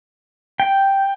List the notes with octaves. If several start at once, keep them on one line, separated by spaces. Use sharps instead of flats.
G5